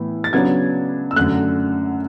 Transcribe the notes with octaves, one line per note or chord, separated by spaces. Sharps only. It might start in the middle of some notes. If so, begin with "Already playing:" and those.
Already playing: A2 E3 B3
A6
C#3 F#3 B3 D4 G#6
E6
F#2 D3 A3 F#6